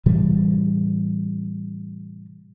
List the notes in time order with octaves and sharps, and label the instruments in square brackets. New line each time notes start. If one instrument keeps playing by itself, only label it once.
[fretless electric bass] A2 C3 E3 G3